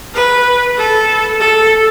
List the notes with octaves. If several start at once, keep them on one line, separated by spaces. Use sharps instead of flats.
B4
A4
A4